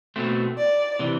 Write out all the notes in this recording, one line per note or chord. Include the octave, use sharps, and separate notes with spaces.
B2 A3 C4
D5
C3 E3